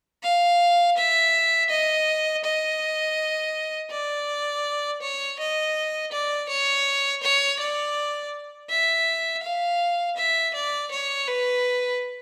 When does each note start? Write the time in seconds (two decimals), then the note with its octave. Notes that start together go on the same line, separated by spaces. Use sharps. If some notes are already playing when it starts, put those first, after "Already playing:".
0.23 F5
0.97 E5
1.70 D#5
2.44 D#5
3.91 D5
5.02 C#5
5.39 D#5
6.12 D5
6.49 C#5
7.23 C#5
7.59 D5
8.70 E5
9.43 F5
10.17 E5
10.54 D5
10.91 C#5
11.28 B4